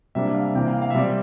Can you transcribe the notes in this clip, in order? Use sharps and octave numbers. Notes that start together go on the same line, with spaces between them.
C3 G3 A#3 D4 E5
F5
C3 E3 A#3 G5
F5
F5
E5
C3 G3 C4 D5